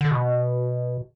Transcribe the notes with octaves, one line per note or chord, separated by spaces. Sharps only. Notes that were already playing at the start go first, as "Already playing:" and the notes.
D3
B2